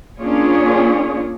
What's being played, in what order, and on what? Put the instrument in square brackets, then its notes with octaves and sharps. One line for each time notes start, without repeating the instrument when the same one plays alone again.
[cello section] A#3 C#4 D4 F4 G#4 C#5